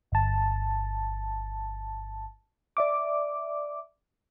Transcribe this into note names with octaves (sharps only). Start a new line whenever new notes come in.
G1 A5
D5 E5 D6